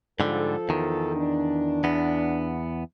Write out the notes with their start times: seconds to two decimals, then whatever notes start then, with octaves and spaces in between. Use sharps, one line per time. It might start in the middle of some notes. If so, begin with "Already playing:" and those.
0.20 G#2 D3 F3 G3 A4
0.69 E2 D#3
1.15 D4
1.84 E2 B3